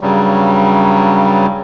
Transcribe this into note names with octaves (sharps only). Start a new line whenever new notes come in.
G2 C#3 F#3 G3